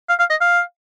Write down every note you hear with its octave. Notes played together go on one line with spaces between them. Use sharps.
F5
F5
D#5
F5